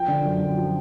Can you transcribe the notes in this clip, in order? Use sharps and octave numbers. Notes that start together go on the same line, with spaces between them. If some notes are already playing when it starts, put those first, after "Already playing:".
Already playing: F3 G5
D3
F#2
F#2
F3